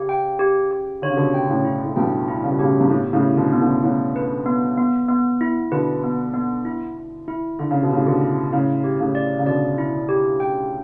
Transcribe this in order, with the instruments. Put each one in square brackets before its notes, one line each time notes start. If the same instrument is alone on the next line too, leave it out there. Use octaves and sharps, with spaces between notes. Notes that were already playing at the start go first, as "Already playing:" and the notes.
Already playing: [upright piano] C#3 [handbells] G4
[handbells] G5
G4
G4
[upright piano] D3 [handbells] C#5
[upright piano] C#3
B2 D3
[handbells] G5
[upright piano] A2 C#3
[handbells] E4
[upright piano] A2
[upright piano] G2 B2 [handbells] G5
[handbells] E4
[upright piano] C#3
B2
[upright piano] A2 C#3 [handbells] G4
[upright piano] G2
[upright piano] A2 [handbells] B3
[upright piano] A2 C#3
[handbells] E4
[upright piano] B2 D3
[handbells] B3
[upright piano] A2 C#3
[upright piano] A2 C#3 [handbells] B3
[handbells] B4
B3
B3
B3
E4
[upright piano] B2 D3 [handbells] B4
[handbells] B3
B3
E4
E4
E4
[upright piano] D3 [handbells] E4
[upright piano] C#3
B2
[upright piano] A2 C#3 [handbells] G4
[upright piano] B2 D3
[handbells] E4
[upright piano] A2 C#3 [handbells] E4
[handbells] G4
[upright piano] A2 C#3
[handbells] D5
[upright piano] C#3
[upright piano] B2 D3 [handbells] D5
[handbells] E4
G4
G5